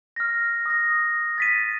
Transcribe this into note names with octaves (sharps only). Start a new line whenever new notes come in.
F6 A#6
D#6 A#6
A6 B6 D#7